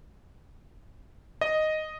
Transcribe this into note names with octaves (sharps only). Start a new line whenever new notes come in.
D#5